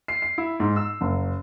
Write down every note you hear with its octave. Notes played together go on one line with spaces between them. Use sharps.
C7
C7
E4
G#2
E6
F#1